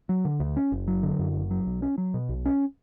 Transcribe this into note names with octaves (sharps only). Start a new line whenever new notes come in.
F#3
D3
D2
C#4
F#1
F#3
D3
F#2
F#1
F#3
B1
C#4
F#3
B2
B1
C#4